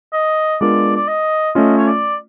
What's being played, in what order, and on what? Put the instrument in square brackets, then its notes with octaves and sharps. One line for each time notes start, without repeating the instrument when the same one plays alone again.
[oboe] D#5
[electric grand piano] G#3 B3 D4 F4 A#4 [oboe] D5
[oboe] D5
D#5
[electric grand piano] A3 C#4 F4 [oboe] D#5
[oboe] C#5
D5